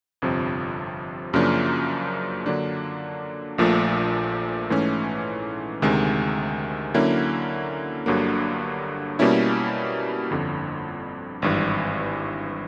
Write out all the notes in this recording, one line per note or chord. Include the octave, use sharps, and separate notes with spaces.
G1 F2 C3 F3
F#2 C#3 F3 A#3 D4
D3 F#3 A#3 D4
A#1 A#2 F3 A3
G#2 E3 A3 C#4
D2 C3 D#3 G#3
D3 F#3 A#3 C#4 E4
G1 G2 D3 F#3 A#3
B2 G3 A#3 C#4 E4
G1 F2 D3
G#1 G2 E3